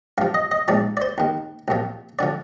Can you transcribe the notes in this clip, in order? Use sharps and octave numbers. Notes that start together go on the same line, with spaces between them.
G2 F3 F5
D#5
D#5
A#1 G#2 F3 D5
D5
C5
D#2 D#3
C2 A#2 F3
D3 F3 D5